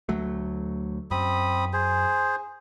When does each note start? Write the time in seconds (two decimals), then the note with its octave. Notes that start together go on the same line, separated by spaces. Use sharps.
0.09 D2 F#3 A3
1.11 F#2 C4 B5 D#6
1.73 G#4 C5